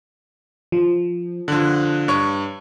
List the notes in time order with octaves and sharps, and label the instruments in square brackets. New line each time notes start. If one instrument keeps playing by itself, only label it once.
[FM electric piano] F3
[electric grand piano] D3 F3 [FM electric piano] F#6
[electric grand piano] G2 C#5 C#6